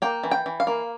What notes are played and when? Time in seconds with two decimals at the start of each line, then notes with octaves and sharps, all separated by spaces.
0.02 A#3 G5
0.23 E3
0.31 G5
0.46 E3
0.60 F5
0.67 A#3